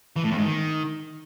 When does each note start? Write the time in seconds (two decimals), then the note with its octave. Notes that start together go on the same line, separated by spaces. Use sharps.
0.16 E3
0.23 A2
0.31 E2
0.38 G#2
0.45 D#3